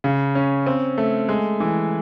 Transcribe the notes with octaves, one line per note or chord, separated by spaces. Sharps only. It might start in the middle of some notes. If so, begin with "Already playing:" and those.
C#3
C#4
C4
A3
G#3
E3